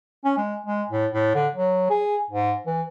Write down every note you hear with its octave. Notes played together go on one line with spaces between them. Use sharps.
C#4
G#3
G#3
A2
A2
D3
F#3
G#4
G#2
E3